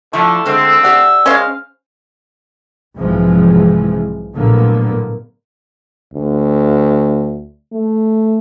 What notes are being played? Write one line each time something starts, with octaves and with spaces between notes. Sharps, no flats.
D3 F3 A3 E4
D3 G#3 C4 C5 E6
G4 D5 F#5
G#3 C#4 C5 F5
B1 G#2 C3 E3 F3 G#3
A#1 A2 D3 F#3 A#3 B3
D2
A3